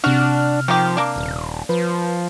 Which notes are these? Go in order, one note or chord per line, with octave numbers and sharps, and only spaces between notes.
C3 D4 F#4 F6
D#3 F3 G4
A#3 D4
D#1
F3 B4